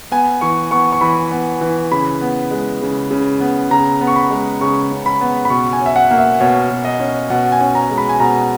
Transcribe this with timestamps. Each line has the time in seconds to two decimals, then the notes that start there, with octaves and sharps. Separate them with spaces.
0.12 B3 G#5
0.41 E3 C#6
0.71 B3 C#6
0.92 C#6
1.01 E3 B5
1.31 B3
1.61 E3
1.92 C#3 B5
2.21 B3
2.51 G#3
2.82 C#3
3.11 C#3
3.40 B3
3.71 C#3 A#5
4.01 B3
4.07 C#6
4.16 B5
4.31 G#3
4.61 C#3 C#6
4.91 C#3
5.06 B5
5.21 B3
5.45 B5
5.50 B2 C#6
5.73 G#5
5.80 C#4
5.86 E5
5.96 F#5
6.11 A#3
6.18 E5
6.40 B2 C#5
6.71 B2
6.85 D#5
7.00 C#4
7.30 B2 F#5
7.52 G#5
7.61 C#4
7.75 A#5
7.90 G#3
7.98 B5
8.09 G#5
8.20 B2 A#5